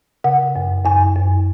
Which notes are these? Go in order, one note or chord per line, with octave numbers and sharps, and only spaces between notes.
C#3 F#5
F#2
F#2 G#5
F#2